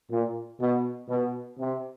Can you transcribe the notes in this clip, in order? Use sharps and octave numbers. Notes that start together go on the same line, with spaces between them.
A#2
B2
B2
C3